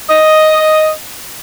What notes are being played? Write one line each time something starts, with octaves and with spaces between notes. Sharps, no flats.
D#5